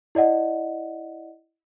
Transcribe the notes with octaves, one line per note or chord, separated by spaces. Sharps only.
E4 D5 D#5 F#5